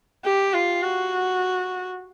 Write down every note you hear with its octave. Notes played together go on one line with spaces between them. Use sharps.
G4
F4
F#4